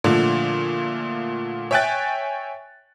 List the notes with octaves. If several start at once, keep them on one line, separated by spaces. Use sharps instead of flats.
A#2 D3 F3 A3
C#5 E5 G5 G#5 F#6 A6